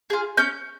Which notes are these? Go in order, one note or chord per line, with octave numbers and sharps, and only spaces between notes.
F4 G#4
C#4 G6